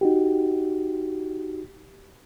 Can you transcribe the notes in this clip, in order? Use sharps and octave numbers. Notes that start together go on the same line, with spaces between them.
D#4 F#4 G4